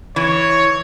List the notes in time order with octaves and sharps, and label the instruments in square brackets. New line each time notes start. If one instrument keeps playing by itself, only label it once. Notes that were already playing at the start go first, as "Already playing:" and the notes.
[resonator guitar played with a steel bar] E3 [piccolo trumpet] C#5